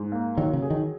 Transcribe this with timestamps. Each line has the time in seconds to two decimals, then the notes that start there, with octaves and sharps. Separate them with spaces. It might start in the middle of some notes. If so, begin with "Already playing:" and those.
Already playing: G#2
0.12 A#3
0.37 D#3 F#3
0.53 C#3
0.62 G#4
0.70 D#3